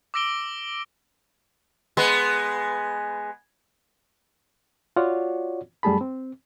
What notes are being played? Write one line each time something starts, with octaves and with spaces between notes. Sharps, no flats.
D6 E6 A#6 D7 G7
G#3 B3
F4 F#4 C#5 D5 F#5
F#2 G3 A3 G#4 A5 B5
C4